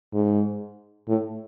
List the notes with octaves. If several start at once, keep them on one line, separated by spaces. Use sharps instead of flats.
G#2
A2